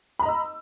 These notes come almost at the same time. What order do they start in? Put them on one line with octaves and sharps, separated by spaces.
B5 A#5 D#5 E6